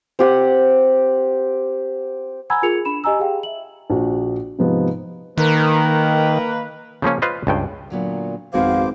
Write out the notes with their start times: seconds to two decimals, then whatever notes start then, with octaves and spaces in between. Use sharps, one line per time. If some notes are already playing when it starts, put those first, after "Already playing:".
0.19 C4 G4 F#5
2.50 F#5 G#5 A#5 B5 E6 G#6
2.62 F4 G#4 A#4 G#6 C#7 F7
2.85 D4 B5 E7
3.04 G4 D#5 G#5 A#5 E6
3.19 G4 G#4 F5 G5
3.43 E5 F#7
3.90 A#1 F#4
4.59 G#2 C3 F3 B3 D#4
5.38 D#3 A#3 B4
7.02 C#3 F3 A#3 C#4
7.22 F4 B4 C5 D#5
7.47 C#2 G2 G5
7.90 A#2 D3 F#3 B3
8.54 G#1 F2 B3 F#4 G#4 C5 F5 D6